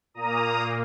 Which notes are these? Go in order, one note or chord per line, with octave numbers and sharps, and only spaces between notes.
A#2 A#3 A#5 D#6